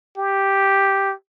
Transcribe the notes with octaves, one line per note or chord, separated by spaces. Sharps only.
G4